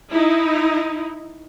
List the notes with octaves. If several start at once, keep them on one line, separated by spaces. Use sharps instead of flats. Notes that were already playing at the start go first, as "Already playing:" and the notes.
D#4 E4